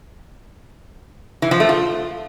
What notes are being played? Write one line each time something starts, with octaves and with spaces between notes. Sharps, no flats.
E3
F3
A3
F4